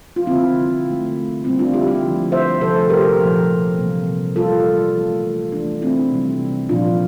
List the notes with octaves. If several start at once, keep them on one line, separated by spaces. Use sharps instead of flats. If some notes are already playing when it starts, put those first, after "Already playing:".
F4
D3 G3 A#3 C4 E4
D3 A3
D3 G3 A#3 C4 E4
D4 F4
E4 G4
E4 G4
D3 F3 A3
C5 E5
C3 F3 A3 A4 C5
G4 A#4
A#2 F3 A#3
C3 E3 G3 A#3
E3 G3 A#3 F4 A4
E3 A3
E3 A3 D4
C4 E4
C3 E3 G3
A#2 F3 A#3 D4 F4